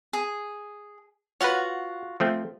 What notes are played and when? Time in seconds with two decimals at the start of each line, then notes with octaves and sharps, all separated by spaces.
0.13 G#4
1.41 F4 F#4 B4 C#5 F#5
2.20 F3 A3 C4